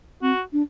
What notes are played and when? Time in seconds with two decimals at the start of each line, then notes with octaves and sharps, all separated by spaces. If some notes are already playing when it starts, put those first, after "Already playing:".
0.22 C4 F#4
0.53 D4